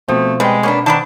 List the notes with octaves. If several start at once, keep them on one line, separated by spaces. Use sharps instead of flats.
B2 F3 A3 C4
G3 G#3 B4 G5
A#3 B3 C#4 D4
D#3 B3 D4 A#4 A5